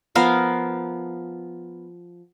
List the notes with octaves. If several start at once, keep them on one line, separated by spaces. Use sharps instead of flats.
F3 B3 A#4 F5